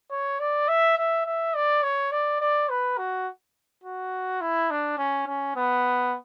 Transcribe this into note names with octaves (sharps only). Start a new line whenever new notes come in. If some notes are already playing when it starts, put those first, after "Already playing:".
C#5
D5
E5
E5
E5
D5
C#5
D5
D5
B4
F#4
F#4
E4
D4
C#4
C#4
B3